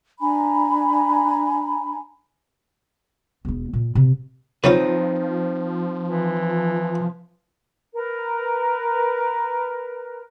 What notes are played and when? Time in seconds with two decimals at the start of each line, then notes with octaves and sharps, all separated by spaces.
0.20 D4 G#5 A#5 B5
3.45 E1 D#4
3.73 A#2
3.95 C3
4.64 C#3 F3 F#3 C4 D#4 F4 B4
6.07 E3
7.94 A#4 B4